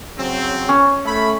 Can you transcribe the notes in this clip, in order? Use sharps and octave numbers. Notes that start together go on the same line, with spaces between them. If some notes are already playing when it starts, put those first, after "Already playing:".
C#3 F#3 C4
C#4
A3 B5